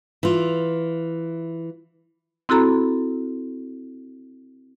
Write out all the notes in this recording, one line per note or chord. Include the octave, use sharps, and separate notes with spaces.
E3 F4
C4 E4 F#4 A4 A#5 B5